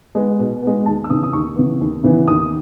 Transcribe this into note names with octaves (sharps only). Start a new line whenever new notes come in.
G#3 B3
B2
G#3 B3
D#2 A5
E6
C#3 E3 B3 D#6
D#6
D#2 C#6
C#3 E3 B3
D#2
C#3 E3 B3
D#2 D#6